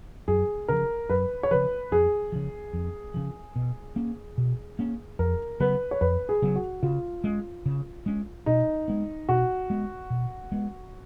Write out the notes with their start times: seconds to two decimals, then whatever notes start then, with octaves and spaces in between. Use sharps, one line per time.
0.28 F#2 G#4
0.68 C#3 F3 A#4
1.09 F#2 B4
1.43 C#5
1.51 C#3 F3 B4
1.92 F2 G#4
2.32 C#3 F3
2.73 F2
3.14 C#3 F3
3.56 B2
3.96 A#3 C#4
4.38 B2
4.79 A#3 C#4
5.19 F2 A#4
5.60 C#3 F#3 B3 B4
5.91 C#5
6.01 F2 B4
6.29 G#4
6.42 C#3 F#3 B3
6.56 F#4
6.83 C#3 F4
7.24 G#3 C#4
7.66 C#3
8.06 G#3 C#4
8.46 B2 D#4
8.88 G#3 B3
9.29 B2 F#4
9.70 G#3 B3
10.10 B2
10.52 G#3 B3